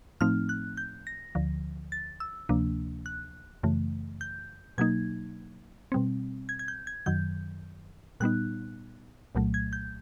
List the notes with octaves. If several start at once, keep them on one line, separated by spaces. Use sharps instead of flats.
A2 F3 A3 C4 D#4 F6
F#6
G6
A#6
D2 D3 F3
A6
E6
D2 C3 F3 A#3 D4
F#6
F#2 C#3 E3 A3
G6
B2 F#3 A#3 D#4 G#6
B2 G3 C4
G#6
G#6
G6
G#6
F#2 D#3 F#3 G6
A#2 G3 B3 D#4 F#6
C2 A#2 F#3 A3
G#6
G6